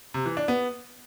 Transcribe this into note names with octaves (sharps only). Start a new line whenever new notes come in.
C3
E3
D4
B3